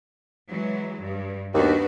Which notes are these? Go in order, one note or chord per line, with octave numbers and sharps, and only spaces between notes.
E3 F#3 G#3
G2
D#2 B3 D4 F#4